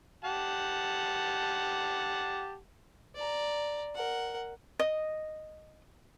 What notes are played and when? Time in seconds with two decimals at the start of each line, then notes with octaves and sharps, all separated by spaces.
0.25 G4 F#5 A5
3.15 D5 A#5
3.95 A#4 F#5
4.79 D#5